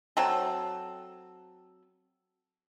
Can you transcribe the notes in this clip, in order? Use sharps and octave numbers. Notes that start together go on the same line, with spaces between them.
F#3 C4 A4